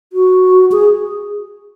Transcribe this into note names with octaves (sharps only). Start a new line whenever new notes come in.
F#4
G#4